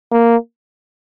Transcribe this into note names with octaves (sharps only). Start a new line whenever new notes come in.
A#3